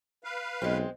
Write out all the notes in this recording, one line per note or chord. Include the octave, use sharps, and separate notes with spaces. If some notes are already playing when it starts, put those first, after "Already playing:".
B4 F5
B1 G#3 C4